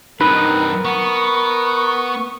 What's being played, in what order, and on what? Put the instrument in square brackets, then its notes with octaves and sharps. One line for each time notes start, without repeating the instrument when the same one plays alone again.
[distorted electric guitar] G2 C4 [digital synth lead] D#4 [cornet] A#4 [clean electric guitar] B4
[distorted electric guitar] B3 [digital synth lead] C#6